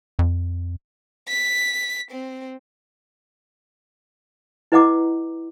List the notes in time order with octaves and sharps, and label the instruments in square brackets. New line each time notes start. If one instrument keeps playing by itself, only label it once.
[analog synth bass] F2
[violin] B6
C4
[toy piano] E4 B4 D#5 F#5 A#5 D6